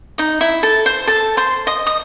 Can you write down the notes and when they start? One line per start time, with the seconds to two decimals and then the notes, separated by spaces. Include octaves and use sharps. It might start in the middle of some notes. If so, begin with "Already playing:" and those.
0.18 D#4 D#5
0.41 E4 E5
0.63 A4 A5
0.86 C5 C6
1.07 A4 A5
1.37 C5 C6
1.67 D#5 D#6
1.87 D#6